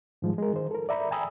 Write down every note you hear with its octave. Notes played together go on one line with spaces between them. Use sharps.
G#2 D#3 F3 G3 G#3
G#3 A#4
D#3 C5
A4 A#4
D5 E5 A#5 B5
G5 G#5 A#5 B5 D#6 E6